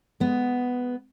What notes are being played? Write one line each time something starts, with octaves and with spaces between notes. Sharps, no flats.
G#3 B3